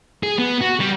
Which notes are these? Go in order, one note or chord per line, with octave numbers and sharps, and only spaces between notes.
G#4
B3
F#4
G3